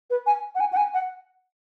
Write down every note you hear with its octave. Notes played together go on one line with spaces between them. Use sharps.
B4
G#5
F#5
G#5
F#5
G#5
F#5